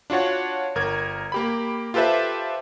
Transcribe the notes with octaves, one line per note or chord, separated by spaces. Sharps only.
D4 F4 F#4 C#5 F#5
G1 A#4 G#6
A#3 G4 B5
F4 G4 A4 B4 C5 E5